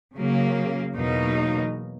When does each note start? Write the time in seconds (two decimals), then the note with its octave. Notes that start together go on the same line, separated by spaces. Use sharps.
0.16 C#3 F#3 A#3
0.96 E2 B2 F#3 A#3 D#4